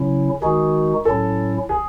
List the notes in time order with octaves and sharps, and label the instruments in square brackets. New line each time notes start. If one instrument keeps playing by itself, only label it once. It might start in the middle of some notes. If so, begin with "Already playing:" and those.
Already playing: [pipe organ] C#3 F#3 C#4 E4
[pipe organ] D#3 G#3 D#4 F#4 [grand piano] G#4
[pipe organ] A2 F#3 C#4 E4 [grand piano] A4
[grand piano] G#4